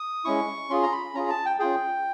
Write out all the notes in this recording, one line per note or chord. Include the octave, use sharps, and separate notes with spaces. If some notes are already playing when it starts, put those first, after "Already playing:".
Already playing: D#6
G#3 C#4 E4 C#6
C#4 F4 G#4 C6
A#5
B5
C#4 F4 G#4 A#5
A5
G5
C#4 F4 G#4 G5